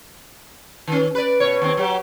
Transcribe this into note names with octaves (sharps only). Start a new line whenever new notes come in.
D#3 C#4
B4 D5
B2 C#5
D#2 C4
F#3 G4